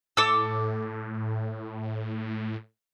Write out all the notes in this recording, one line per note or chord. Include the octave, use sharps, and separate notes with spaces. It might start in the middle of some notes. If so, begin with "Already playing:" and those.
A2 A4 D6 E6